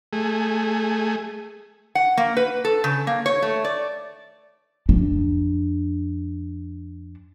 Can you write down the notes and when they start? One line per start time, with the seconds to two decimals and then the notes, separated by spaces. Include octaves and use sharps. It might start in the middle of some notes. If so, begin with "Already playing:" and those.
0.13 A3 G#4
1.95 F#5
2.17 A#3
2.37 B4
2.65 A4
2.84 C#3
3.07 A#3
3.26 C#5
3.42 A3
3.64 D5
4.89 F2 D4